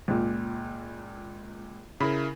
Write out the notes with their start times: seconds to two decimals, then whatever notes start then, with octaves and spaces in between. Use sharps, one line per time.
0.08 C#2 A#2
2.00 C#3 E4 A#4 B5